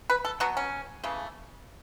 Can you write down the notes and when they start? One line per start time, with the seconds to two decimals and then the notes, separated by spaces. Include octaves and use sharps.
0.10 B4
0.25 A4
0.40 B2 F#3 B3 F#4
0.57 C#4
1.04 C#3 E3 A3